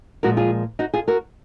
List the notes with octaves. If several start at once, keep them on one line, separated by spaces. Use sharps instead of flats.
A#2 F3 G#3 F#4 A#4
F4 G#4
D#4 F#4
F4 G#4
F#4 A#4